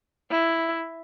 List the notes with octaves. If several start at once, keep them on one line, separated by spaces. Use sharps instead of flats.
E4